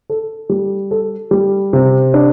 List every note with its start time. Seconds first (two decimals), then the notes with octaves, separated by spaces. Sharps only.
0.10 A4
0.49 G3
0.91 A4
1.31 G3
1.73 C3
2.14 D4